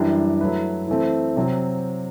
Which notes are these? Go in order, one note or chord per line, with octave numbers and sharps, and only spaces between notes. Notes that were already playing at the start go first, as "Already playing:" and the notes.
Already playing: F#2 E3 G3 D4
F#3 A3 E4 B4
E3 A3 C4
C3 F#3 C4